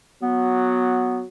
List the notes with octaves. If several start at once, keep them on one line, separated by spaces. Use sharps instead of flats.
F#3 B3